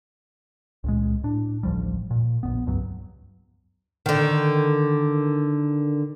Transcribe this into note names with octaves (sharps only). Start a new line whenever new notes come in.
C#2 A#2 G#3
A2 D4
A1 D2 F3 G3
A#2
A#1 F#2 B3
C#2 G2 F#3
D3 D#3